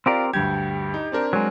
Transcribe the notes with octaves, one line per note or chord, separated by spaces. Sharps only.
C4 F4 G4 A#4 D5
D2 G2 G4 G#6
D#4
C4 D4 A#4
F#3 G#3